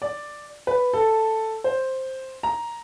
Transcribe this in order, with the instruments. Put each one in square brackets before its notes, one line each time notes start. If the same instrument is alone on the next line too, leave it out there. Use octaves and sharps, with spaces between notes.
[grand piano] D5
B4
A4
C5
A#5